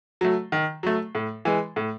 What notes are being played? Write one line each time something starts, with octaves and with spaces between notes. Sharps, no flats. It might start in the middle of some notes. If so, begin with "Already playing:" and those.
F#3 A3
D#3
F#3 A3
A2
E3 G#3
A2